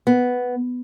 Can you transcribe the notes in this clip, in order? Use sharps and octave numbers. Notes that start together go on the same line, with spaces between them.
B3